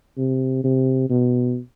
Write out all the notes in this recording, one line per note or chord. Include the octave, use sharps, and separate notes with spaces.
C3
C3
B2